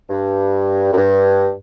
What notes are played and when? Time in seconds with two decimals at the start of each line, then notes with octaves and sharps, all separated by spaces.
0.10 G2
0.93 F#2
0.97 G2